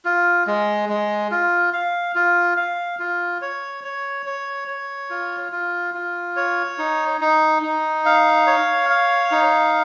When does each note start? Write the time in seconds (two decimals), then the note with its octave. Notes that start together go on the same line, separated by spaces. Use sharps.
0.05 F4
0.47 G#3
0.89 G#3
1.31 F4
1.73 F5
2.15 F4
2.57 F5
2.99 F4
3.42 C#5
3.84 C#5
4.26 C#5
4.68 C#5
5.10 F4
5.52 F4
5.94 F4
6.36 C#5
6.78 D#4
7.21 D#4
7.62 D#4
8.05 F5
8.47 C#5
8.90 F5
9.31 D#4